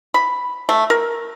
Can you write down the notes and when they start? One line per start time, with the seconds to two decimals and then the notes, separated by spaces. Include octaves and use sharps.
0.14 B5
0.69 A3
0.90 A#4